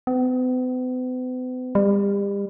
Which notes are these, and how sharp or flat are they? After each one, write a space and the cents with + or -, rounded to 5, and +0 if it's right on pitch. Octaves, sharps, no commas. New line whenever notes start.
B3 +45
G3 +35